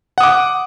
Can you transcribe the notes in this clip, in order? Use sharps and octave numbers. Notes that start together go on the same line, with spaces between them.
F#5 D6 D#6